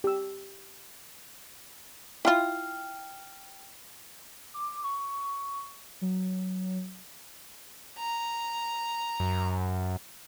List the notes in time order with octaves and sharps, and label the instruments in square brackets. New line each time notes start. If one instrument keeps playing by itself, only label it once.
[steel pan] G4 E6
[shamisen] E4 F4 [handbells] G5 F6
[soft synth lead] D6
C#6
F#3
[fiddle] A#5
[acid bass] F#2